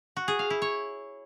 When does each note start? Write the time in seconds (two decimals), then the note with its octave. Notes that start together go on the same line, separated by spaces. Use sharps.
0.17 F#4
0.28 G#4
0.39 F5
0.50 E4
0.62 C#5